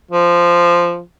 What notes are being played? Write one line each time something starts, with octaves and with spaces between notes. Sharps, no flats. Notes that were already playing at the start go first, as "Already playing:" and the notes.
F3